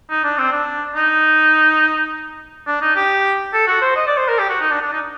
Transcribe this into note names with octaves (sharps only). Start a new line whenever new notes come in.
D#4
D4
C4
D4
D#4
D4
D#4
G4
A4
F#4
C5
D#5
D5
C5
A#4
G4
F#4
D#4
D4
D4
D#4